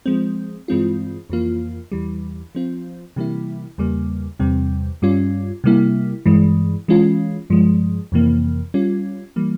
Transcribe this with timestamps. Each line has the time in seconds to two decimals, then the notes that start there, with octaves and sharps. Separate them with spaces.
0.06 F3 G#3 C4
0.68 G2 E3 G#3 C4 F4
1.30 F2 E3 A#3 F4
1.92 E2 E3 G3
2.55 F3 C4 F4
3.16 C3 E3 G3 A#3 E4
3.78 E2 C#3 G3 A#3
4.39 E2 C3 G3 C4
5.02 G2 G3 C#4 F4
5.64 C3 G3 A#3 E4
6.26 G2 E3 G#3
6.88 E3 G#3 C#4 F4
7.50 G2 F3 G#3
8.12 F2 C3 E3 A#3
8.74 G3 C#4 F4
9.36 E3 G3 A#3